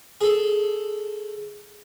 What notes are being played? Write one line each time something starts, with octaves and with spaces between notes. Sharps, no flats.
G#4 A4